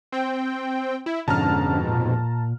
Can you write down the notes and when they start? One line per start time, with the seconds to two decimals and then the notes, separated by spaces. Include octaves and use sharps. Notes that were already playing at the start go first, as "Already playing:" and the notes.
0.12 C4 G5
1.06 E4
1.28 F2 G#2 B2 D3 C#4 A5 A#5 F6
1.87 A#2